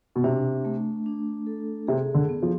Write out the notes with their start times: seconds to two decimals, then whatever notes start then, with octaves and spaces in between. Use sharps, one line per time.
0.16 B2
0.24 C3 D4
0.65 A3
1.06 D4
1.47 A4
1.87 C3 G#4
2.14 D3
2.29 B3
2.42 F3